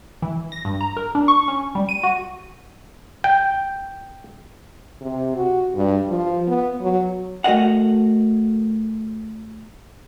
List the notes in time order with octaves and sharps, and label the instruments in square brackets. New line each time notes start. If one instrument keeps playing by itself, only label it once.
[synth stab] E3
A#6
G2
A#5
A#4
D4
C#6
C#4
G3
D#7
F#4
[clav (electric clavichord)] G5
[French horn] C3
F#4
G2
F3
B3
F#3
[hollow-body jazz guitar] A3 F#4 A#4 D#5 F#5